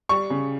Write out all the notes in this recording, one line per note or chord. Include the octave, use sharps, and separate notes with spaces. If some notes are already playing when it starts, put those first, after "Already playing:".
G3 C#6
C#3